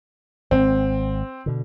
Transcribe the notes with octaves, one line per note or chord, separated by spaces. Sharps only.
G#1 G#3 C4
B2 D3